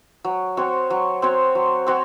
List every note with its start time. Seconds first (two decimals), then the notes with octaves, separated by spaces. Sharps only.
0.24 F#3
0.57 C4 F#4 C#5
0.90 F#3
1.22 C4 F#4 C#5
1.55 F#3
1.87 C4 F#4 C#5